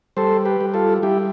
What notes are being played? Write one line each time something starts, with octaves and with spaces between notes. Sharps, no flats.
G3 A4 C5
G4 B4
G3
F4 A4
G3 E4 G4